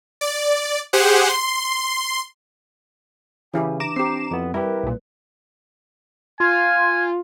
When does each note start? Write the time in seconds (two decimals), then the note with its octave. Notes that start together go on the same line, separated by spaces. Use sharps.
0.21 D5
0.93 G4 G#4 C5 F#5
1.29 C6
3.54 C#3 E3 E4 G4 G#5
3.80 D4 A#5 D6 E7
3.96 C4 G4 C7
4.31 F2 B3 E4
4.54 G3 E4 G4 A#4 B4
4.83 B1 A#2
6.40 F4 G#5